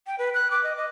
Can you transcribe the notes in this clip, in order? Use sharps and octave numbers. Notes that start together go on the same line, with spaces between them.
G5
B4
F#6
D6
D#5
D#5